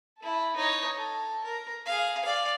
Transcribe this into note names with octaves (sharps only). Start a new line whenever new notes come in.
E4 A4
D#4 C#5
A4
A#4
G#4 F5
D5 F5